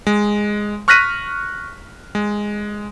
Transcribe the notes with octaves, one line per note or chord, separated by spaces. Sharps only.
G#3
C#6 F6 F#6 A#6 B6 D#7
G#3